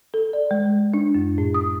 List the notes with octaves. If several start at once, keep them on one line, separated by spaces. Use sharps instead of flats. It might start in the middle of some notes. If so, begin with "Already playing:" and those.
A4
D5
G#3
D4
F#2
A2
D#6